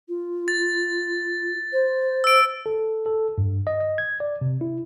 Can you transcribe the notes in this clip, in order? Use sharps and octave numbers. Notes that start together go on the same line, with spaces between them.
F4
A6
C5
E6 D7
A4
A4
G2
D#5
D#5
G#6
D5
C3
E4